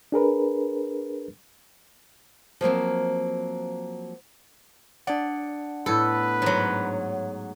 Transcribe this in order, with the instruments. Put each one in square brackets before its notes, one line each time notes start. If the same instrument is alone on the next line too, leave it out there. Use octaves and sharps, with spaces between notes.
[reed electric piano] D4 G#4 A#4 B4
[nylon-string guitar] F3 F#3 A#3 C4
[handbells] D4 F#5 [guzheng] D5
[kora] A2 B3 [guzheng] A4 [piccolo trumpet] B4
[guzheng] G#2 F#3